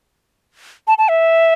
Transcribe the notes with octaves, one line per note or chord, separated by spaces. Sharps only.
A5
A5
E5